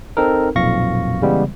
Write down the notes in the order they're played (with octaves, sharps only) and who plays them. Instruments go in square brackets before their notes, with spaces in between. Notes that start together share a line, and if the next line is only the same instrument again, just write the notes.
[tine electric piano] C4 D#4 A4 A#4
B1 F2 A#2 F5 C#6 A#6
C#3 E3 G3 G#3 B3